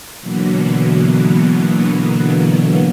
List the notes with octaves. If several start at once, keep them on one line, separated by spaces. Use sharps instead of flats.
B2 D3 E3 F#3 A#3 B3